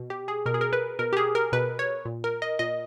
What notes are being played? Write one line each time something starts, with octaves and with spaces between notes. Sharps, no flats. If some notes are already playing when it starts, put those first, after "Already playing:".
Already playing: B2
G4
G#4
B2 A#4
G#4
A#4
B4
B2 A#4
G4
G#4
A#4
B2 B4
C#5
A#2
A#4
D#5
A#2 D#5